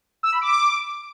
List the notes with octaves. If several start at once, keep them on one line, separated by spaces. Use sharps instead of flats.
E6
B5
D6